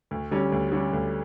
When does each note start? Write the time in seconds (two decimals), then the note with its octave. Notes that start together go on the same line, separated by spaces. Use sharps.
0.11 D2
0.31 D3 G3 C#4
0.52 D2
0.72 D3 G3 C#4
0.93 D2